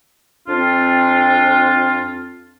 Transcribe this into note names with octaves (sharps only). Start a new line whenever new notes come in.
F2 C4 D4 F4